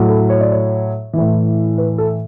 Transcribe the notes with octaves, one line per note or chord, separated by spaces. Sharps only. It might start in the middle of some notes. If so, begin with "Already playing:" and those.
Already playing: A2 F#3
A4
C#5
D5
C#5
A2 E3
B4
A4